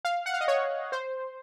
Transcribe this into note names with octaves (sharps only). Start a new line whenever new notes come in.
F5
F#5
F5
D#5
C#5
C5